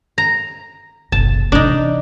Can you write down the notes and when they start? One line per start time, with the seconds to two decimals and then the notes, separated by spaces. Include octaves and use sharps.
0.18 A#5
1.12 F#1 B1 A5
1.52 C3 E3 D4 D#4